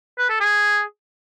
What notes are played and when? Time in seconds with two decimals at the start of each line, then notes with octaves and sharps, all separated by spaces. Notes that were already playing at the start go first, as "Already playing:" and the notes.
0.18 B4
0.29 A4
0.40 G#4